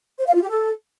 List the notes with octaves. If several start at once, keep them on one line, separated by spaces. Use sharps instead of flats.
C5
F5
F4
G4
A4